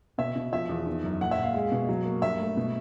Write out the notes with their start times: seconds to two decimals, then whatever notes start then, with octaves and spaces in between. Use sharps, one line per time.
0.18 B2 E5
0.36 B2
0.52 F3 E5
0.69 E2
0.86 D#3
1.04 F#2
1.21 A#2 F#5
1.31 E5
1.38 A#2
1.43 F5
1.54 G#3
1.72 B2
1.89 F#3
2.05 A#3
2.22 G2 E5
2.40 A3
2.57 B2